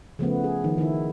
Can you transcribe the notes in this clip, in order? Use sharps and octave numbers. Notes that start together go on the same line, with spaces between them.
C#3 F3 A3 B3
G#4
D#3 F3
D#3 E4